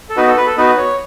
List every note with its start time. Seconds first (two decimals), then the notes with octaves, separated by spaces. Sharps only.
0.09 A4
0.17 B3 D#4 F#4 B4
0.27 A4
0.37 B4
0.46 A4
0.57 B3 D#4 F#4 B4
0.77 C#5